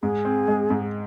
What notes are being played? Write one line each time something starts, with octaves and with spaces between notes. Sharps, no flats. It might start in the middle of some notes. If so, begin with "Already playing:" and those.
G#2 G#4
C4
G#3
G#2